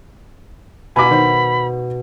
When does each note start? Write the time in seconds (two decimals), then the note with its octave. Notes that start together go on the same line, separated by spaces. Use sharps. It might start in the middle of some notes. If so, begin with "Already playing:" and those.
0.96 B2 G#5 A#5 B5 D6
1.11 D#3 C5